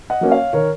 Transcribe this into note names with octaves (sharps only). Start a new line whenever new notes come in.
D#5 F#5
F#3 A#3 C#4
C#5 F5
D#3 A#4 C#5